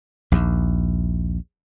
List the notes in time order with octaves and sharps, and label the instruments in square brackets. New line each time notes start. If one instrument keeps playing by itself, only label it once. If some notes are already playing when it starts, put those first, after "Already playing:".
[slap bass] A#1 D#2